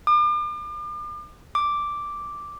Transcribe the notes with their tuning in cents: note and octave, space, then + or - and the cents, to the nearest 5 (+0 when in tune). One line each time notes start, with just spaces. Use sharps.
D6 +40
D6 +0